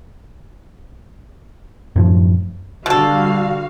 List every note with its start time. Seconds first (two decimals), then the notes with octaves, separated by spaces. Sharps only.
1.96 F#2 A2 F3
2.86 B2 D3 G3 F#4 A4 F5